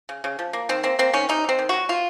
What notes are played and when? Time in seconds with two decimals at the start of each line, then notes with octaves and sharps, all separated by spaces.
0.09 C#3
0.24 C#3
0.39 F3
0.53 A#3
0.69 D#3 C4
0.83 A#3 C4
0.99 A#3 C4
1.13 D#3 C#4
1.29 C3 D#4
1.44 C3 C4
1.59 D#3
1.69 F#3 F#4
1.89 C3 F4